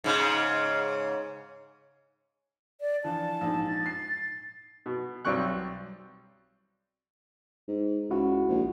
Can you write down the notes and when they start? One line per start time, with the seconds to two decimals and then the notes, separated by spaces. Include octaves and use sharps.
0.04 G#2 C#3
2.81 D5
3.04 E3 F3 D4 A5
3.41 A#1 G#2
3.67 A6
3.86 C7
4.86 B2
5.25 B1 F#3 G3 C4 C#6 F#6
7.68 G#2
8.11 C#2 E4 F#4 F#5
8.49 A#1